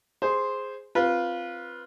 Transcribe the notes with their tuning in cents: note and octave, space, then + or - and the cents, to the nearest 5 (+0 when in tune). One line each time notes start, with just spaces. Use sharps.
G#4 +0 C5 +0
C4 +0 F4 +0 B4 -20